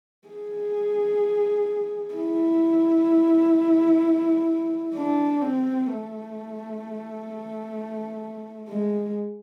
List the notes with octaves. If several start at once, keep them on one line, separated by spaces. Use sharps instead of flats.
G#4
E4
D4
C4
A3
G#3